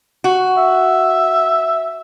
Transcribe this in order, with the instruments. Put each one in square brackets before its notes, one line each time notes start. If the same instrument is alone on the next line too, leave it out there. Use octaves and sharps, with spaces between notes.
[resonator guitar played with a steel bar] F#4
[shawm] E5